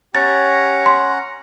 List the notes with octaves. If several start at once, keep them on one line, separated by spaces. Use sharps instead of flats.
C#4 G4 C#5 F#5 A#5 A6
C6